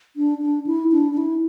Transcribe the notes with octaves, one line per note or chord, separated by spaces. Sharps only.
D4
D4
E4
D4
D4
E4